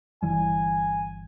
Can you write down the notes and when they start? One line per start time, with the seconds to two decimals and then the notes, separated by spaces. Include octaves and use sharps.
0.23 G1 E3 G3 G#5